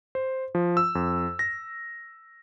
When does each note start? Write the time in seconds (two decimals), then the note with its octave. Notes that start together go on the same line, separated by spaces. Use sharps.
0.15 C5
0.55 F3
0.77 E6
0.95 F2
1.39 A#6